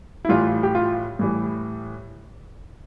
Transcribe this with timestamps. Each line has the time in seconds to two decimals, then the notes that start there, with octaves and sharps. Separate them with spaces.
0.25 E4
0.29 A2 E3 G3 F4
0.63 G4
0.75 F4
1.19 A2 E3 G3